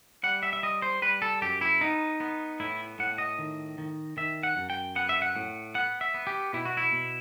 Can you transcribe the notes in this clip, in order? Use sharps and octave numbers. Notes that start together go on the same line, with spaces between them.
G3 F#5
E5
E5
G3 D#5
C5
G3 B4
A4
F#2 G4
E4
B3 D#4
B3
A2 E4
A2 F#5
D#5
D#3
D#3
D#3 E5
F#5
F#2
G5
B3 F#5
E5
F#5
A2
B3 F#5
E5
B3
G4
B2 E4
F#4
E4
B2